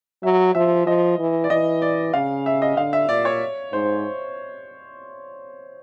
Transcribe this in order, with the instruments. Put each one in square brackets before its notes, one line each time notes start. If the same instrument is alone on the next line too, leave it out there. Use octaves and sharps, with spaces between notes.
[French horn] F#3 [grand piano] E5
[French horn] F3 [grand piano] E5
[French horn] F3 [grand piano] D#5
[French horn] E3
[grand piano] D5
[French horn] E3 [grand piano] D#5
[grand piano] D5
[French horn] C#3 [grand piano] F5
[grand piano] E5
D#5
[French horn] D3 [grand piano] F5
[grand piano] E5
[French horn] A#2 [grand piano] D5
[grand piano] C#5
[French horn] G#2 [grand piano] C5